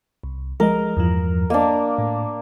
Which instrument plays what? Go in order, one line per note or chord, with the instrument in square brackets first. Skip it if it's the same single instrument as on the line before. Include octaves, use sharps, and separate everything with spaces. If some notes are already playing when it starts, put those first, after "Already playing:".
[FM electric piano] C2
[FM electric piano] F3 G#3 D#5 [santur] A#4
[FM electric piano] E2 G2 F3
[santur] A#3 D4 [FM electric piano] D#5 F5
[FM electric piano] A2